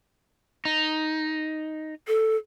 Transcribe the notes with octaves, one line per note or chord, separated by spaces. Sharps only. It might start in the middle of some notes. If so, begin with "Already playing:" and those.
D#4
A4